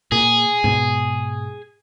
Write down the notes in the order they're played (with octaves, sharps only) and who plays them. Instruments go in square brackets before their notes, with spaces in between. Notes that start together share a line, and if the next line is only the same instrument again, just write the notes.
[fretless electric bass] A#2 [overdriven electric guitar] G#4
[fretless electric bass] G#2 B2